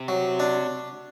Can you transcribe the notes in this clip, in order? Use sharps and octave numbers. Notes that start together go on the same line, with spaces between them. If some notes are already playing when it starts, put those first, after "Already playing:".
Already playing: C3
F#3
D4